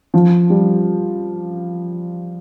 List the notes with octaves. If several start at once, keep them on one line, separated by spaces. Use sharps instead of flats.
F3
G3